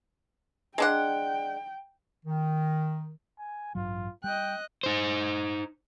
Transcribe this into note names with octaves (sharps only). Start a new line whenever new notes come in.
G#3 D4 F#5 G5
D#3
G#5
A1 G2 F#3 F4
G3 D#5 G5 F#6
D#4 C5